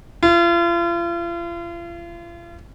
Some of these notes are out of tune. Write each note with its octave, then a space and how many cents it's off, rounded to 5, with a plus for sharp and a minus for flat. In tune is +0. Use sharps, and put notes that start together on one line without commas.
F4 -40